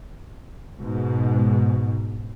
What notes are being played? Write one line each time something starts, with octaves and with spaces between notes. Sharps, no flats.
G#2 B2